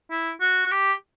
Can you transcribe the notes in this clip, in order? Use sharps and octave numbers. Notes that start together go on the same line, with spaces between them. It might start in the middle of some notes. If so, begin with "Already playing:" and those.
E4
F#4
F#4
G4